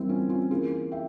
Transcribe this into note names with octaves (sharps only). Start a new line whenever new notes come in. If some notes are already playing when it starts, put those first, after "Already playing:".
Already playing: E3 G3 A#3 C4 E4
C#4 F4
C#4 F4
E3 A#3 F4 G#4
E5 G5